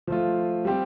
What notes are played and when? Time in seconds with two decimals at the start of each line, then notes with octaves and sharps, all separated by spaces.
0.07 F3 A3 F4
0.65 G3 C4 G4